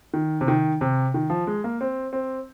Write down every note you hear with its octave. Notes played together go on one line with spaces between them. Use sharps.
D#3
C3
D#3
C3
D#3
F3
G#3
A#3
C4
C4